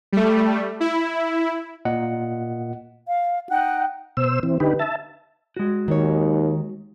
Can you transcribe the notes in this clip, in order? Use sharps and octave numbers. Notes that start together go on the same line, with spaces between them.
G3 A3
E4
A#2 D#5 F#5
F5
D#4 F#5 G5 F#6
B2 C5 E6
E3 C4
D3 D#4 G4 B4
E5 A5
G#3 F#4
D#2 D#3 C#5